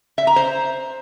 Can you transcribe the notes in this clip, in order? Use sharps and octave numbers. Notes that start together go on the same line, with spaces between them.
E5
A#5
C5